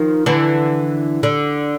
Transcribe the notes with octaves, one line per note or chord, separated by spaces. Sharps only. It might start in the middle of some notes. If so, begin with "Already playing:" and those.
Already playing: D#3 F3
D3 E3
D3